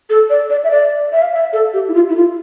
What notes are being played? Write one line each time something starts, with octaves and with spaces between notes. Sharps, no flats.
A4
D5
D5
E5
D5
E5
F5
E5
A4
G4
E4
F4
E4
F4